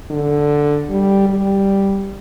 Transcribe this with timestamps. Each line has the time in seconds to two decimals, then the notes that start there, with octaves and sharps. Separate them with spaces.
0.11 D3
0.89 G3
1.29 G3